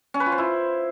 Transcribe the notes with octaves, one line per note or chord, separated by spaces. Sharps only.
C#4
B4
F4
C5
E4